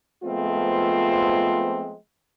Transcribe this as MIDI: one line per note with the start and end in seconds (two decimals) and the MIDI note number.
0.23 1.94 53
0.23 1.94 56
0.23 1.94 57
0.23 1.94 59
0.23 1.94 60
0.23 1.94 65